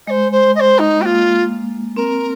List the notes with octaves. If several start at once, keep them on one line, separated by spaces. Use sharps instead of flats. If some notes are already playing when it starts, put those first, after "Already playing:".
G#3 C5 D#5
C5
D#5
C5
D#4
A#3 F4 G4
C4 A#4